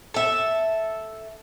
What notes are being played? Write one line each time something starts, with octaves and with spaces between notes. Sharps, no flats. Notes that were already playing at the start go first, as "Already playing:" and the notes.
A4 E5